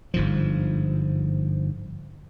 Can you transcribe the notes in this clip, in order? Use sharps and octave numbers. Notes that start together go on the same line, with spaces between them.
G1 G#2 F3